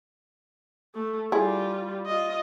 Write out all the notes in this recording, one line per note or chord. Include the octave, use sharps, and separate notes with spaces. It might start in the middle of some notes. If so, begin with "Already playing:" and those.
A3
G3 E4 F4 G#4
F4 D#5